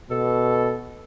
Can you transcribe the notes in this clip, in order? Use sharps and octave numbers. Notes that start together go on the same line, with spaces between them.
B2 A4